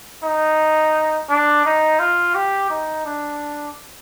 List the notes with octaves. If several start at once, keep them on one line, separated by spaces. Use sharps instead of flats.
D#4
D4
D#4
F4
G4
D#4
D4